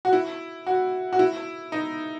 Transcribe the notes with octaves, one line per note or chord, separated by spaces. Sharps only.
F#4
E4
F#4
F#4
E4
D#4